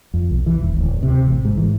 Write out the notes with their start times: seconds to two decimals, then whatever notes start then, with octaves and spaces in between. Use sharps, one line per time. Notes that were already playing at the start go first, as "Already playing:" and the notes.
0.14 F2
0.31 B1
0.46 E3
0.62 E1
0.77 D1
1.03 C3
1.27 A1
1.45 G#2
1.57 E3